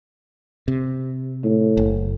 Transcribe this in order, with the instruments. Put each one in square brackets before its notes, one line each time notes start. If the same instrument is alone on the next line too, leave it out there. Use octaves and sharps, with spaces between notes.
[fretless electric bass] C3
[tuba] A2
[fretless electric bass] F#1